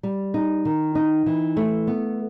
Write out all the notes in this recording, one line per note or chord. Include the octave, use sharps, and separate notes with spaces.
G3
D#4
D#3
D#4
E3
A3
B3